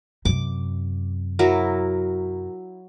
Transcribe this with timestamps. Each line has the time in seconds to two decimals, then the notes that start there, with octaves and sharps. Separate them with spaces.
0.25 F#2 C3 D6
1.39 F#3 E4 A#4